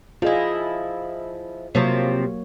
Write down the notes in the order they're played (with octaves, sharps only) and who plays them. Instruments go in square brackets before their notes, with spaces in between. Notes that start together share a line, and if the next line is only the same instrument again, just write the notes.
[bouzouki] F3 E4 [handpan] F4 G#4 D#5
[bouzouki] C3 F3 C4 [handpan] F#3 A#3 C#5